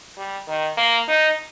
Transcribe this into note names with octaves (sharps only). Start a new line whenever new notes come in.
G3
D#3
A#3
D#4